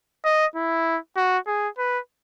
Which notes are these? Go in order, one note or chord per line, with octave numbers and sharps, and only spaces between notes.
D#5
E4
F#4
G#4
B4